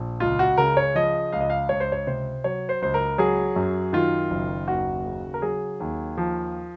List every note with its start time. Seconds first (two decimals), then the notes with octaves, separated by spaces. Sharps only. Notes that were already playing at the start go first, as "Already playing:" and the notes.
Already playing: A#1
0.20 C#2 F4
0.39 F#4
0.58 C#3 A#4
0.77 C#5
0.95 F3 D#5
1.32 C#2 F5
1.40 D#5
1.50 F5
1.69 C#2 C#5
1.80 C5
1.92 C#5
2.07 C3 C5
2.44 F#3 C#5
2.69 C5
2.82 C#2 C5
2.94 A#4
3.18 F#3 G#4
3.56 F#2
3.93 D#3 F4
4.30 F#1
4.68 D#2 F#4
5.06 C#3
5.34 A#4
5.42 F#3 G#4
5.80 D#2
6.17 F3